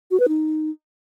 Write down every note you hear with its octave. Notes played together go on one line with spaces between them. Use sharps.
F#4
B4
D#4